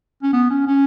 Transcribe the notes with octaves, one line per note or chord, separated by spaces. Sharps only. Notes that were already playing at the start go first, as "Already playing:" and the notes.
C#4
B3
C#4
C#4